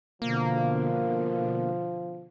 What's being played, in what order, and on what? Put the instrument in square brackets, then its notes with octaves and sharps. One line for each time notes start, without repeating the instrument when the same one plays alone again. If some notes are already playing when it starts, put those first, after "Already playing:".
[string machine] B2 D3 [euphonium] F3 [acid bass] A#3